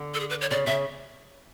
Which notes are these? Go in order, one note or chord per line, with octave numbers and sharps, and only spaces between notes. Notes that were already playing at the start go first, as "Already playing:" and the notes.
Already playing: D3
A4
G#4
B4
C#5
C#3 D5
C#3 E5